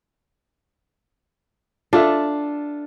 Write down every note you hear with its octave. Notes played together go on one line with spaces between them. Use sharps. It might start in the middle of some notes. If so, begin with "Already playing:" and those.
D4 F4 A4 E5